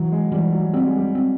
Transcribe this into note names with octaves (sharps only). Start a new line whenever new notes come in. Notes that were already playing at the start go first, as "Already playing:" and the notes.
Already playing: E3 F#3
G#3
E3 G3
F#3
G3 C4
G#3
G3
C4